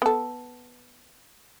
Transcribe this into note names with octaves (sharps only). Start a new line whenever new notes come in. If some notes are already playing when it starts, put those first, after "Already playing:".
B3 A4